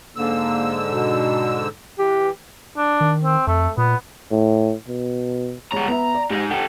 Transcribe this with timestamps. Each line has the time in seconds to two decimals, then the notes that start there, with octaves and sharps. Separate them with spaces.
0.16 G#2 D3 A#3 E6
0.89 B2
1.99 E3 G4
2.77 D4
3.00 D#3
3.24 C4
3.47 F2 A3
3.77 A#2 B3
4.31 A2
4.88 B2
5.72 G3 G#3 C#5 A#5
5.88 B3 E5 A#5
6.14 D5
6.30 G#2 D#4 G4
6.51 G4 A4 F#5 G#5